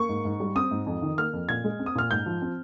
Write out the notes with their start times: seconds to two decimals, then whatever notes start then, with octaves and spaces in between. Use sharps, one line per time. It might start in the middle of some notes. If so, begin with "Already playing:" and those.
Already playing: A#3 C#6
0.09 G#2
0.25 G#2
0.40 G3
0.55 C4 D#6
0.71 G#2
0.86 F2
1.02 D#3
1.18 A#3 F6
1.33 F2
1.49 A#2 G#6
1.64 G#3
1.79 C4
1.86 D#6
1.95 A#2 F6
2.11 G#2 G6
2.26 F3
2.42 C4